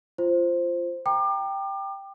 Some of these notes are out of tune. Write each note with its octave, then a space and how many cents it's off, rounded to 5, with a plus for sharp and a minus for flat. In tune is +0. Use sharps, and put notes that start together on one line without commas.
F4 -15 C5 +0
G5 +0 A#5 +0 D6 +35